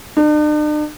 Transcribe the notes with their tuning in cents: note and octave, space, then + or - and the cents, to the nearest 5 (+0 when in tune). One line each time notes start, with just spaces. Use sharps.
D4 +45